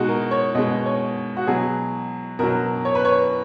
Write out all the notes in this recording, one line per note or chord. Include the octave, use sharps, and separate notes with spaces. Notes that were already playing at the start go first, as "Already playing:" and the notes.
Already playing: B2 G#3 D#4 F#4
A#4
C#5
B2 G#3 D#5
C#5
F#4
B2 F#3 G#4
B2 F#3 A#4
C#5
B4
C#5